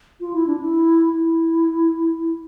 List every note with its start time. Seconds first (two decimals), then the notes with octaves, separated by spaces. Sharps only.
0.20 F4
0.33 E4
0.46 D4
0.59 E4
1.13 E4